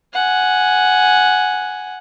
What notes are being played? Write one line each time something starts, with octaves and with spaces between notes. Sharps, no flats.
F#5 G#5